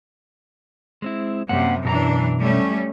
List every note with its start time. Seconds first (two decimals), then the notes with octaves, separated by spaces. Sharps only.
1.02 G#3 C4 E4
1.49 F#2 C3 G3 A#3 F#5
1.85 F#2 B2 E3 D4 A#4 A#5
2.40 G3 A3 C#4